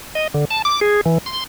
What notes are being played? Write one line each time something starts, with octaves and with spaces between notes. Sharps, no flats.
D#5
D3
A5
D6
G#4
E3
C6